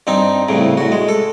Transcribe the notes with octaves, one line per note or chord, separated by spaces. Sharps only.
G2 C4 D#4
C2 A2 C#3
A2 F#4
G#3
A4